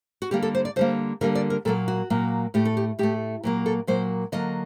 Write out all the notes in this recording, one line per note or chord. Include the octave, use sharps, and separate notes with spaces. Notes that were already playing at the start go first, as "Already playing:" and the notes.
F#4
D3 G3 A#3 G4
A4
C5
D5
D3 G3 A#3 C5
D3 G3 A#3 A#4
D5
A#4
A#2 F#3 A#3 A4
F#4
A#2 F#3 A#3
A2 A3 G4
A4
G4
A2 A3 G4
A#2 F#3 A#3
A4
A#2 F#3 A#3 C5
D3 F#3 A#3 D#5